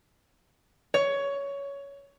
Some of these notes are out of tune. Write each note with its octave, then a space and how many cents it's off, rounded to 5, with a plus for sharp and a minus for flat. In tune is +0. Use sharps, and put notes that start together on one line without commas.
C#5 +15